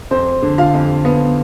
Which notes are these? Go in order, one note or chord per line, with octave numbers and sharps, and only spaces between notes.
F2 C4 C5
D3
F4 F5
F2
B3